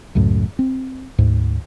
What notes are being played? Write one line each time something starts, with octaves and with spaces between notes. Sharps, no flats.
C#2 F#2 A2
C4
D2 G#2